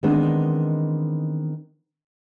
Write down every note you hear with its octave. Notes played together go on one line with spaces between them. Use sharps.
D#3 E3 G#3 B3 C4 D4